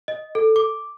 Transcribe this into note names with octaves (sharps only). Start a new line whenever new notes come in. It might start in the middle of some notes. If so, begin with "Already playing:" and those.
D#5
A4
D6